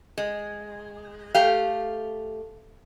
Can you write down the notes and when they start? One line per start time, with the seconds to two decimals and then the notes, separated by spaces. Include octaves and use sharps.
0.18 G#3
1.35 A3 G4 F5